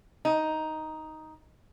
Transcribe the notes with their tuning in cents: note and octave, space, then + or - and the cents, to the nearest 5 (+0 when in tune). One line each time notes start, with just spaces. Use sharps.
D#4 +5